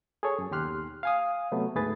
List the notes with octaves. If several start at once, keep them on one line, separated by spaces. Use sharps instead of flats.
G#4 A4 C#5
F#2
D#2 B2 G4 C6 F6 F#6
F5 G#5 D#6
C3 F#3 A3 B3
D2 G#2 A3 G#4 B4 A6